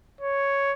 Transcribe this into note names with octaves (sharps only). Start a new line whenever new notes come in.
C#5